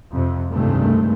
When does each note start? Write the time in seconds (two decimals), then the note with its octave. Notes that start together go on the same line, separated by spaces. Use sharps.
0.12 F2 C3
0.52 C#2 G2 C3 D#3 G#3 A3